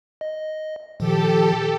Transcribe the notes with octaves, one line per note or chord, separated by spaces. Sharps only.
D#5
A#2 D#3 F3 G4 A4